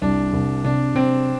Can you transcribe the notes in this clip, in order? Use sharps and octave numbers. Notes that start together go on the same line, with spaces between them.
C2 D4
C2
C3 D4
C3 C4